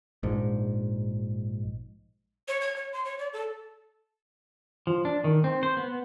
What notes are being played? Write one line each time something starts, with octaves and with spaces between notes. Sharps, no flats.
A#1 G#2
C#5
G#6
C#5
C6
C#5
D5
A4
F3
D4
D#3
C4
C5
B3